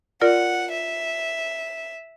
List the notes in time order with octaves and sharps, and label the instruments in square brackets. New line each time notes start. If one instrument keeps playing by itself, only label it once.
[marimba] F4 A#4 D5 [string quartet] F#5
[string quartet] E5